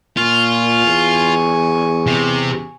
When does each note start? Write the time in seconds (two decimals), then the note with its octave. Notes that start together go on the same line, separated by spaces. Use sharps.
0.17 A#2 F4 G#5 C#6
0.86 E2
2.06 C3